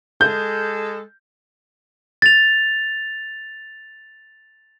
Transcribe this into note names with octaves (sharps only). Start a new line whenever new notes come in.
G#3 A4 G6
A6 F7